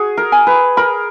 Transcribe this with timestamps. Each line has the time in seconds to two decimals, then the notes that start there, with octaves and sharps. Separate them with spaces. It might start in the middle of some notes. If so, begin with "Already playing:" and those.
Already playing: F#4 G#4
0.17 A#4
0.32 G#5
0.47 B4
0.77 A#4 B5